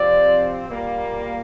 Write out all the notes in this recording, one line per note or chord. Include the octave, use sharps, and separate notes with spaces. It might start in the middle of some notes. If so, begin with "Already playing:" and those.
Already playing: C3 F3 C4 D5
A#2 G3 A#3